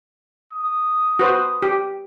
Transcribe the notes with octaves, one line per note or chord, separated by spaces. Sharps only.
D#6
F#4 B4 C5
G4